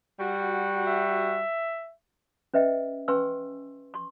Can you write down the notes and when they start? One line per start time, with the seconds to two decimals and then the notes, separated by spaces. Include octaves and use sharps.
0.19 G3 F#4
0.87 E5
2.54 C#4 B4 D#5 E5 G5
3.08 C#4 B4 G#5 C6 C#6 E6
3.94 C6 C#6